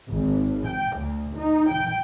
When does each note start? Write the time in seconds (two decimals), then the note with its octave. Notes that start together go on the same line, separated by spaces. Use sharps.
0.12 G#1
0.67 G5
0.97 D2
1.37 D#4
1.70 G5